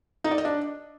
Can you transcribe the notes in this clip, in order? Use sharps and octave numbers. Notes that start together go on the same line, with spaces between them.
D#4
D5
D#5
D4